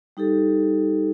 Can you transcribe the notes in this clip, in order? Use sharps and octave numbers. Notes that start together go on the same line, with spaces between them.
G3 D#4 G4 A4